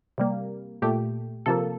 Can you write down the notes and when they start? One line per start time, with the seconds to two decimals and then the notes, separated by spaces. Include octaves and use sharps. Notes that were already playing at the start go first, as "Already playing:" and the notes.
0.18 C3 G3 A#3
0.82 A#2 A3 G4
1.46 C3 F3 A#3 A4